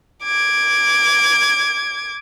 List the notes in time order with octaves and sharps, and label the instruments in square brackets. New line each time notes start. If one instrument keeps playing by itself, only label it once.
[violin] D6 G#6